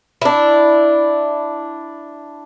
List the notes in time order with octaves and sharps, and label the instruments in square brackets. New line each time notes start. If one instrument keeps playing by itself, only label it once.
[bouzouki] D4 E4